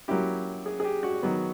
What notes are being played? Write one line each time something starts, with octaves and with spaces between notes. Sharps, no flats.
F#3 A#3 C#4 E4 G4
G#4
G#4
G4
F#4
D#3 F#3 B3